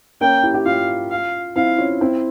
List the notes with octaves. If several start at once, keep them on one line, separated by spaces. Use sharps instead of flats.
A#3 C#4 G5
E4 G4
E4 G4
C#4 F4 F5
F5
C4 E4 F5
C#4 F4
C4 E4